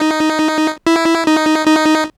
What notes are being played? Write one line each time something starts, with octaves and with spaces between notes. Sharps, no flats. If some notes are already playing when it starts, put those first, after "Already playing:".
Already playing: D#4
E4
D#4
D#4